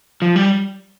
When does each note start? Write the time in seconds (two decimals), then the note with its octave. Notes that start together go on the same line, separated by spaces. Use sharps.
0.22 F3
0.36 G3